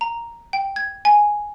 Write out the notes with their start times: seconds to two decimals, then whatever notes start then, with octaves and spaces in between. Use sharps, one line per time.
0.01 A#5
0.53 G5
0.76 G#6
1.05 G#5